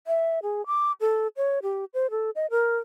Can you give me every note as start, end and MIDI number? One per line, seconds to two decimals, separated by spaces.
0.07 0.39 76
0.43 0.65 68
0.66 0.92 86
1.01 1.28 69
1.37 1.59 73
1.63 1.85 67
1.94 2.10 72
2.11 2.30 69
2.36 2.46 75
2.51 2.77 70